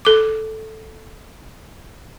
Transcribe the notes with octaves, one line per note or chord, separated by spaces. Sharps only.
A4 D6